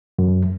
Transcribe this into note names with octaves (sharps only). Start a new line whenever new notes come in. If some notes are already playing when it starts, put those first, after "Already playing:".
F#2